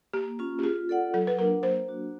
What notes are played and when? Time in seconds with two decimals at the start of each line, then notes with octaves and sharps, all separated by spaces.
0.13 A#3 G4
0.39 C#4 F4
0.59 G4
0.63 F4 G#4
0.89 A4 D5 F#5
1.14 F#3 A4
1.27 B4
1.39 A#3 D4 A#4
1.63 A#3 C5
1.88 D4 F#4